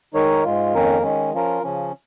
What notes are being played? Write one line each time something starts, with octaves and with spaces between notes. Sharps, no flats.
D#3 G#3 D#4 A#4 C#5
G#2 G#3 F4
F2 D#3 A#3 C#4 A#4
D#3 G#3 C#4
F3 C#4 F4 A#4
C#3 F3 C#4